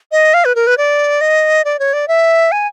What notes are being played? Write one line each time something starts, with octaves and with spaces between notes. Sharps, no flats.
D#5
F5
B4
A#4
B4
D5
D#5
D5
C#5
D5
E5
G#5